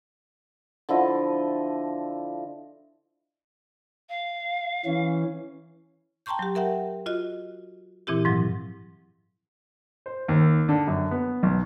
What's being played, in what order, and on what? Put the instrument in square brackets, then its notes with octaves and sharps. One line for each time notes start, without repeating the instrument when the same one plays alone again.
[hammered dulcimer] D3 F3 E4 D#5
[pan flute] F5
[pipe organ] E3 C#4
[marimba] G5 A5 A#5 C6 C#6 G6
F#3 G4
A#4 E5 F#5 G5
F4 F#4 D#5
A#2 E3 C4 E4 G4
G#2 F3 F#3
[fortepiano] C5
D#2
D3
F#2
B3
B1